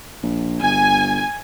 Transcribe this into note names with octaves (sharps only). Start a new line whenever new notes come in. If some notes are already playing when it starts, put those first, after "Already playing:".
A#1
G1 G#5